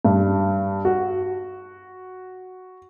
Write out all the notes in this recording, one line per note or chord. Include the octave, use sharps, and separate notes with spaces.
G2
F#4